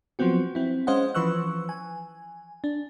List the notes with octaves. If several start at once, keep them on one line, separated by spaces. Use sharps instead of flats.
F3 F#3 B3 C4 F#4
C4 E4
G#3 C#4 C5 D#5 F5 F#5
E3 F3 B4 C#6 E6 F#6
G#5
D4